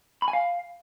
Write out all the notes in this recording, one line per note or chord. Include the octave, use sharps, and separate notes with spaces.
B5
G#5
F5